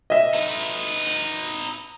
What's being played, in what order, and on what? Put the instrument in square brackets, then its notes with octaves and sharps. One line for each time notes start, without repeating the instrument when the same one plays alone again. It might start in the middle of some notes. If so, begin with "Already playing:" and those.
[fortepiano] D#5 E5
[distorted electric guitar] D#4 B4